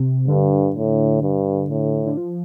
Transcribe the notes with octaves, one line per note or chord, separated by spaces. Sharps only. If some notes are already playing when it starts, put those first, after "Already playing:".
Already playing: C3
G2 D3
A2
G2
A2
D3
F3